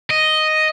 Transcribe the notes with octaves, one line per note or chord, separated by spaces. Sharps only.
D#5